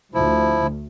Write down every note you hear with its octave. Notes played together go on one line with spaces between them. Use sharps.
D2 F3 E4